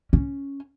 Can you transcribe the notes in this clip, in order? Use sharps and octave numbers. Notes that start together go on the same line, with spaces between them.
C#4